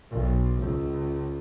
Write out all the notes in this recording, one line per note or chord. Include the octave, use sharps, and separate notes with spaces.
B1
C#2